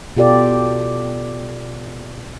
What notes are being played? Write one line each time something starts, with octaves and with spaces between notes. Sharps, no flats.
B2 F4 G4 A4 D5